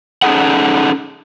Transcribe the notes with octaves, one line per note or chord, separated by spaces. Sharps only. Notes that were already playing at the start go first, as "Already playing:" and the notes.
C#4 D#4 F4 G#4 A4 F#5